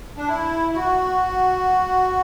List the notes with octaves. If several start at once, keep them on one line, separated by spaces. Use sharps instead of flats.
D4
E4
E4
F#4